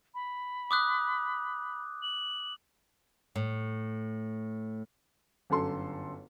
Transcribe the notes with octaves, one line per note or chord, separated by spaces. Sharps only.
B5
D6 D#6 F#6
F#7
A2
G1 F#2 A4 C6